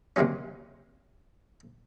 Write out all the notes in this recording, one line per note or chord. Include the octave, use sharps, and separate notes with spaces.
D#2 C3 D#3 F#3 C#4